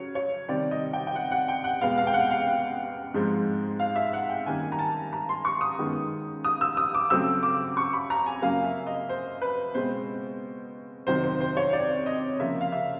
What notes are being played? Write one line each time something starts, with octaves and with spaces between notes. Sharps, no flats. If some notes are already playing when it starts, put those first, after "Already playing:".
Already playing: C#3 F#3 C#5
C#5
C3 D#3 G3 C4 D5
D#5
G5
G5
F#5
F#5
G5
F#5
E2 B2 G#3 B3 F5
F5
G5
F#5
F5
G#2 F3 G#3 C4
F5
E5
F#5
G5
F#2 D#3 G3 A#3 G#5
A#5
A5
A#5
C6
C#6
D#6
F#2 D#3 G#3 B3
D#6
E6
D#6
D6
C#3 F#3 A3 C4 E6
D6
C#6
B5
A#5
G#5
F#2 C#3 F#3 A#3 F5
E5
D#5
C5
B4
B2 G#3 C4 C5
F2 C3 D#3 F#3 C5
C5
C5
C#5
D5
D#5
C#3 F3 A#3 E5
F5
E5